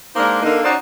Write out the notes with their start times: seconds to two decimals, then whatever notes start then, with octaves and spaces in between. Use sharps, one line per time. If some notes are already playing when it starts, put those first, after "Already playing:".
0.16 G#3 A#3 D4 D#4 A#4 C5
0.43 D3 A#3 D#4
0.65 C#4 D#4 F#4 C5 D5